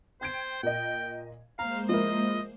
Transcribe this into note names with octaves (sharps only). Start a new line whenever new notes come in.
C5 G5 G#6 D7
A#2 A#4 D#5 G5
G#3 A#3 C5 F5 A#5
F3 E4 A#4 D#5